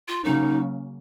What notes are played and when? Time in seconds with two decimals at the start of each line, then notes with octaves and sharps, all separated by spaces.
0.08 F4
0.24 C#3 F#3 A#3 C#4 D#4